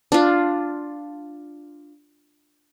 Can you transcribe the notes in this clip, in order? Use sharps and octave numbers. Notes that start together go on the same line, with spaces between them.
D4 F4